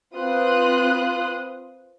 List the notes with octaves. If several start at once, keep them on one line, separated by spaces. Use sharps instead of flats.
C4 F4 B4 C6 D#6 F#6